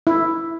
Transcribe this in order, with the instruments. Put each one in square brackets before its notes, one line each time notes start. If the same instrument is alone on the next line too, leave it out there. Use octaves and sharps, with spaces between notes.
[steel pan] E4